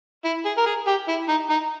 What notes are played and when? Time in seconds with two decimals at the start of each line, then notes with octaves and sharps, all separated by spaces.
0.25 E4
0.45 G#4
0.58 A#4
0.66 G#4
0.87 G4
1.08 E4
1.28 D#4
1.50 D#4